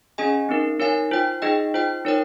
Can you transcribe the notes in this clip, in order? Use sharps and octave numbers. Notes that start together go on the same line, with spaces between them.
C#4 G#4 D#5 G#5
C4 D#4 A#4
D#4 A#4 C#5 F5 G#5
F4 C5 G5
D#4 G#4 D#5 G5
F4 C5 G5
D#4 A#4 C#5 G5